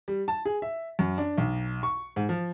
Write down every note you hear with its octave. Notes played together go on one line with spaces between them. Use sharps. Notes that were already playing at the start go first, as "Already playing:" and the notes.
G3
A5
G#4
E5
F#2
D4
B1
C#6
G#2
F3